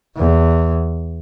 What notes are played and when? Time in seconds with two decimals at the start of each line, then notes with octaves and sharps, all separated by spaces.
0.17 E2